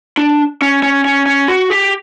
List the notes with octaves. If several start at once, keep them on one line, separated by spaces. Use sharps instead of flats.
D4
C#4
C#4
C#4
C#4
F#4
G4